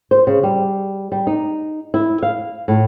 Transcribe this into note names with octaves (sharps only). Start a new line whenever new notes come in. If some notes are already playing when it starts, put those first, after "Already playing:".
C5
C#3
G3
G3
D#4
E4
F5
A2